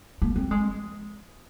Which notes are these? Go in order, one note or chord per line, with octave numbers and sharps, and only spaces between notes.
A#3
C4
G#3